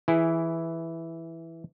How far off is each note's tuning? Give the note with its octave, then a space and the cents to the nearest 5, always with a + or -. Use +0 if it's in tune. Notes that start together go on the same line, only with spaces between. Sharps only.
E3 +0 E4 +0 G#4 +0